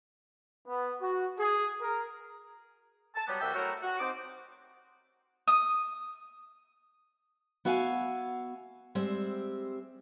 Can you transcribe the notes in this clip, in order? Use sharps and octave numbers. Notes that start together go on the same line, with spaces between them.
B3
F#4
G#4
A#4
A5
F#3 G3 B3
C2 G3 F#4 E5 G5
F#3 A3 E4 F#4 A#4
F#4
C4 D#4 C5 D6
D#6
B3 F#4 E5 F5 G5 G#5
G3 G#3 C4 C5 E5